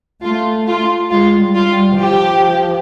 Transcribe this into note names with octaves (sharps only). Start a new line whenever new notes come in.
A3 F4
F4
G#3 F4
G3
F4
G3
F3 G4